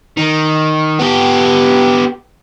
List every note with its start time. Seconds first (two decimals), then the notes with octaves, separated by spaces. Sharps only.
0.17 D#3
0.99 B3 G4